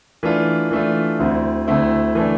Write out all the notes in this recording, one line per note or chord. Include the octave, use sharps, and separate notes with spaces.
E3 A3 D4 F4
E3 A3 D4 F4
D2 D3 A3 C4 E4
D2 D3 A3 C4 E4
E3 A3 D4